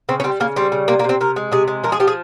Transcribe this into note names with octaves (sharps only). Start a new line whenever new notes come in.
C#3 C4
C#4
G3 C4
C#3 A#3
G3 C4
C#3
C3 A#3
A#3
C3
C4
C3 A#4
G#3
C3 G#4
G#3
F3 A#4
G#4
F3 G4
G#4